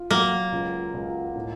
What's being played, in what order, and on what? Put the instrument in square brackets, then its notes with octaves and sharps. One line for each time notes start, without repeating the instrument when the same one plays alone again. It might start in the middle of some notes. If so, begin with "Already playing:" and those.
Already playing: [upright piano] F4
[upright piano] F#3 [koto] A#3
[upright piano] C#2
C#2
A2